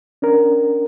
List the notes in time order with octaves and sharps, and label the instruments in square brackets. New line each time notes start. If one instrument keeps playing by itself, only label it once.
[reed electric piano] C#4 D4 A#4